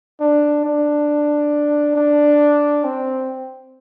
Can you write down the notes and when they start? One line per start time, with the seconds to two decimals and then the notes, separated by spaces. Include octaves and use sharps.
0.21 D4
0.65 D4
1.96 D4
2.84 C4